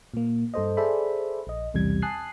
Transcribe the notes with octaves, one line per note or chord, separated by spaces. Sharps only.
A#2 A#3
G2 A4 C5 D#5
G#4 A4 C5 D5 E5 B5
A#1 D#5
B1 E2 C3 G3 G#6
G#5 A5 D#6 F#6 C7